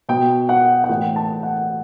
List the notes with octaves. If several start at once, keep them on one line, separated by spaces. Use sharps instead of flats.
B2 G5
F#5
F#5
A2 E3 G5
A5
F#5